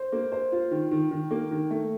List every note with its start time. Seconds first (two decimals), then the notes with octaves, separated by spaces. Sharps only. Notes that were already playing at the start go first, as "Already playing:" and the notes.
Already playing: C5
0.12 A#3
0.32 C5
0.52 F4
0.71 D#3
0.91 D#3
1.11 D#3
1.31 A#3
1.51 D#3
1.71 A3